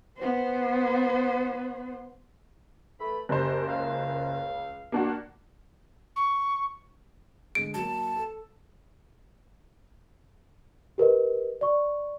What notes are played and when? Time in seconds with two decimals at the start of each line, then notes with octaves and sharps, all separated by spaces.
0.18 B3 C5
2.99 E3 A3 B5
3.29 F#1 C2 G4 C5
3.68 C#2 F5
4.92 D#3 A#3 D4 F#4
6.16 C#6
7.55 D3 G#3 D7
7.74 F#3 A#3 A5
8.16 A4
10.98 G4 A#4 B4 D#5
11.61 D5 C#6